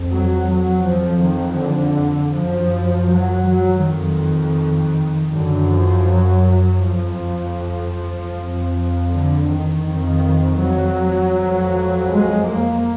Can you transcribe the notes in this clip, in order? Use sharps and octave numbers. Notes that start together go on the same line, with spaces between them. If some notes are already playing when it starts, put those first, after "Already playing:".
Already playing: F2
F#3
F#3
F2 F3
D#3
D3
F#2 F3
F#3
F#3
F2 D#3
F#2 D3
F3
F#3
F#3
F2 F3
F2
D3
D#3
F2 D#3
F#3
F2
G#3
A#3